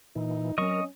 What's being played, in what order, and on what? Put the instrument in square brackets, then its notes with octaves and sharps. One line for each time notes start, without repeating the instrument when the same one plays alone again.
[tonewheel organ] A#2 E3 [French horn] D#4
[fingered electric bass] F#3 C4 [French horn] C#4 [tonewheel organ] A#4 [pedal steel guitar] D#5 C#6